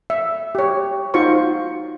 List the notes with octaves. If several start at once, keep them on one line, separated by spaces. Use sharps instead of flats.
E5
G4 C#5
D#4 F4 F#4 C5 C#6